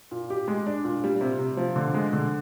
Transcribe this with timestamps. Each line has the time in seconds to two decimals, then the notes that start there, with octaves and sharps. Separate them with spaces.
0.11 A#2
0.30 G4
0.48 G#3
0.66 D4
0.84 A#2
1.04 G3
1.21 C3
1.39 C3
1.57 F3
1.76 D3
1.94 G#3
2.13 D3